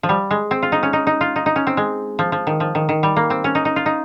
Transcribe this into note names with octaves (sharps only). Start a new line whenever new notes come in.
F3
G3
G#3
C4
F4
D#4
C#4
D#4
D#4
F4
D#4
D#4
C#4
C4
G#3
F3
F3
D#3
F3
D#3
D#3
G3
A#3
C4
C#4
D#4
D#4
F4
D#4